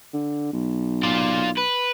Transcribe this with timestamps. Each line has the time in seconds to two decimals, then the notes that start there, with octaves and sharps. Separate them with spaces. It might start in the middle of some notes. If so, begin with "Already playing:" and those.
0.13 D3
0.52 B1
1.03 F4 D5
1.58 B4